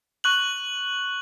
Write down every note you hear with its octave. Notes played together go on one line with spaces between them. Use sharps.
C#6 F#6 F#7